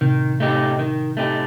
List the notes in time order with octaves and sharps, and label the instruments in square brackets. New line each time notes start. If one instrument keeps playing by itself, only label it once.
[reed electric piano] A2 C3 [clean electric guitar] D#3
[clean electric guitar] A3 D#4 G4
D#3
A3 D#4 G4